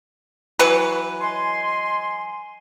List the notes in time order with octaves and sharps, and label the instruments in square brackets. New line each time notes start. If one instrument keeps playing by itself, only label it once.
[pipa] E3 F#3 B4
[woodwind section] D#5 G#5 C6